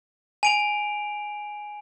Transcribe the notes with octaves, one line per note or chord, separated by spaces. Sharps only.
G#5 D7 F7